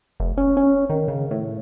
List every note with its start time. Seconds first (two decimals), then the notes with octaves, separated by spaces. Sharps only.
0.20 F1
0.37 C#4
0.57 C#4
0.90 D#3
1.08 C#3
1.31 A2